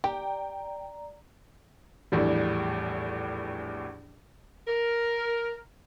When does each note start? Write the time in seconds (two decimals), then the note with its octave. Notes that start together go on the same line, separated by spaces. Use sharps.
0.04 G4 D5 G5 A#5
2.12 A#1 E2 A2 G3
4.68 A#4